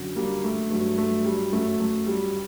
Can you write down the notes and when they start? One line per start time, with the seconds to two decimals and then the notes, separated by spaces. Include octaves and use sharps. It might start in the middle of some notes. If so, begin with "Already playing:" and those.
Already playing: F#2 D3 F#3
0.16 G3 A#3
0.44 A3
0.71 G2 F#3 A3
0.98 A3
1.25 G3
1.53 F#2 F#3 A3
1.80 A3
2.07 G3